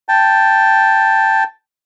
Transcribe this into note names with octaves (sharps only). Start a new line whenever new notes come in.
G5 A5